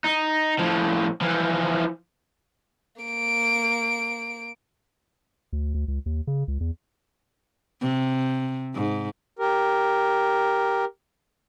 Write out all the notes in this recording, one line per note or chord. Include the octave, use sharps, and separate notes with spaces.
D#4
A2 F3
E3 F3
A#3 D7
D2
D2
C#2
D#2
C#3
C#2
E2
C3
G#2
G4 A#4